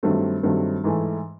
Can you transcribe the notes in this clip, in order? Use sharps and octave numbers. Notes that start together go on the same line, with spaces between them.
G2 D#3 F#3 A3 C4
G2 D#3 F#3 A3 C4
G#2 E3 A3